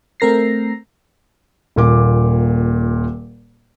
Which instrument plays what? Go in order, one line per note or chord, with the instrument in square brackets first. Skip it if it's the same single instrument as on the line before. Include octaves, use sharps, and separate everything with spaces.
[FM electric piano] A3 C4 A#4 A#6 C7
[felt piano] D#1 A#2 D6